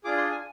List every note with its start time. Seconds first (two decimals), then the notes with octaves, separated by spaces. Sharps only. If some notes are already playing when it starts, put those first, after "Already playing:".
0.04 D4 F4 G#4 D6
0.18 C6
0.31 G#5